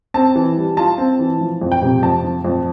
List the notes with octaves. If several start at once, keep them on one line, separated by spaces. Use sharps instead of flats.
C4 A5
E3
G3
F4 A5
C4
E3
F3
F2
G5
C3
F2 A5
F3
F2